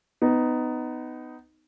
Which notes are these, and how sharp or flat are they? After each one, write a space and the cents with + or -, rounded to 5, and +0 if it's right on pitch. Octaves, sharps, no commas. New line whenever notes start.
B3 +20 D#4 +0